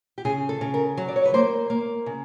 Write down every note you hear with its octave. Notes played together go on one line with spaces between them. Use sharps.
G4
C#3 G#4
A4
C#3
A#4
F#3
D5
C#5
B4
A#3 C5
A#3
C#3